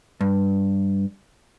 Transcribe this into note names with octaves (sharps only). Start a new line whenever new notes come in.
G2